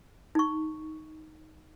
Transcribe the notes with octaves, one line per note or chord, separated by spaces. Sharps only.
D#4 C#6